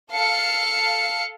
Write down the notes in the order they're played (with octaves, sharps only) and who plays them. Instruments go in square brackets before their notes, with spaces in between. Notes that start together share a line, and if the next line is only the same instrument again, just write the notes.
[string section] A4 F5 C#7